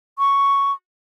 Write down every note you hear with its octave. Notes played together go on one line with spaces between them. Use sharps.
C#6